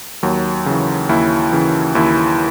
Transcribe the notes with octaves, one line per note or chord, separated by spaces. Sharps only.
D#2 F#3
C#3 E3
D#2 E4
C#3 E3
D#2 E4